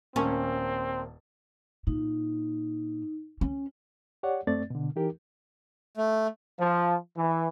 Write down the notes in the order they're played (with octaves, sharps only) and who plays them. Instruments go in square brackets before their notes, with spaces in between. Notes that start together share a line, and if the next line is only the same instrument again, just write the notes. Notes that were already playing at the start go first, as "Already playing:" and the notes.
[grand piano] D#1 A#3 A5 [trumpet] C4 [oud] C#4
[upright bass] A#2 [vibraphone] D#4
[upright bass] C#4
[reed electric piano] G4 C#5 D5 F#5
F#2 A3 C4 D5 A6
B2 D3
E3 D#4 G4 A#4
[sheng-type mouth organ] A3
[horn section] F3
E3